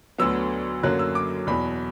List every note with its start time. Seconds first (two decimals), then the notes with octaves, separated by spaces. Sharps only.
0.18 D2 D3 F#3 B3 E6
0.83 F#2 D3 F#3 A#3 C#4 F#6
0.99 E6
1.15 D6
1.47 E2 B2 F#3 B5